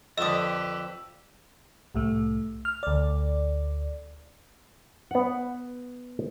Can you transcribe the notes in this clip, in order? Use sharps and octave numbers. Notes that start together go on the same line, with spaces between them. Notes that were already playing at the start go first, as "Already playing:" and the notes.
F2 D3 G4 B4 D#5 D#6 E6 E7
C2 A2 A3
F6
D2 D5
B3 F#5